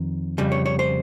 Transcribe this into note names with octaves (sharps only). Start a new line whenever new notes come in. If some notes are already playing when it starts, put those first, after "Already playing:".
Already playing: F2 D#3
F2 C#3 G3
C#5
C#5
C5